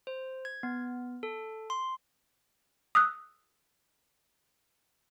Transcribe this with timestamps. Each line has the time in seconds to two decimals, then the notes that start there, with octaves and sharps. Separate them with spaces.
0.07 C5
0.45 G#6
0.63 B3
1.23 A4
1.70 C6
2.95 D#6 E6 F#6